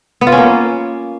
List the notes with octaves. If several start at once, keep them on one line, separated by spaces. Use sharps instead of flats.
B3
F4
C#4
A#3